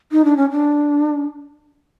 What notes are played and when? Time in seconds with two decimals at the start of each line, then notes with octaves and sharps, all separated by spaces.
0.12 D#4
0.25 D4
0.37 C#4
0.51 D4